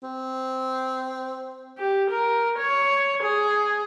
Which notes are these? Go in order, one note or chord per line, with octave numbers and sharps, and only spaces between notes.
C4
G4
A#4
C#5
G#4